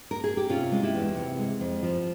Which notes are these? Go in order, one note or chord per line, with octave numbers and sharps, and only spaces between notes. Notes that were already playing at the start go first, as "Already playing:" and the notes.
A#4
G#4
G4
C3 C#4 F4
G#3
E4 G4
E2
C3
G#3
F2
F3